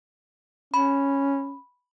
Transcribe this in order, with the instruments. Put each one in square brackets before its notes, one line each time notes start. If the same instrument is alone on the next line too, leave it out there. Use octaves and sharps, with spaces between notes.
[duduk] C#4 [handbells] B5